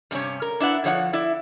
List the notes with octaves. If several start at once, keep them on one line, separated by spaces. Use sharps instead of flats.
G2 C3 C#4 C#5
A#4
D4 E4 B4 F#5
D3 F3 C#5 D#5 F#5
E4 D5